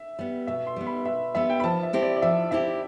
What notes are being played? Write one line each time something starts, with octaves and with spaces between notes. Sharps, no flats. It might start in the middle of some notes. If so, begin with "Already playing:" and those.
Already playing: E5
G3 B3
B2 E5
C6
G3 B3
B5
B2 E5
G3 B3 E5
G5
B5
F3 A5
E5
C4 E4 G4
D5
D5
F3 E5
C4 E4 G4 E5